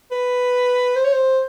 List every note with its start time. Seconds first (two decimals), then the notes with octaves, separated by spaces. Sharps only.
0.11 B4
0.96 C5
1.05 C#5
1.13 C5